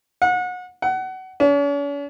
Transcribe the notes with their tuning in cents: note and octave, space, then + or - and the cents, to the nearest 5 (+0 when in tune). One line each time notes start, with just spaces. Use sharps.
F#5 -30
F#5 +25
C#4 +45